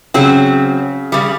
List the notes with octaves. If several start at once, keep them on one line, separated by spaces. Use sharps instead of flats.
C#3 F#3 C4
C#3 G3